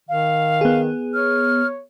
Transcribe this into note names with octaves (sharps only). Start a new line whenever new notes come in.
D#3 F5
B3 G#4
C#5 F6